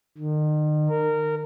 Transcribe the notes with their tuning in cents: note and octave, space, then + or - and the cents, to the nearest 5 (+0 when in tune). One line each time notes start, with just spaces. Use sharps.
D#3 -40
A#4 -20